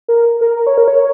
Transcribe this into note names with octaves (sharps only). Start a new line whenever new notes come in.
A#4
A#4
A#4
C#5
A#4
C#5